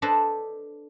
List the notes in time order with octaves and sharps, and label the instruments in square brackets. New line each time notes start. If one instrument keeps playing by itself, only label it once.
[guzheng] D4 A4 B4 C5 D#5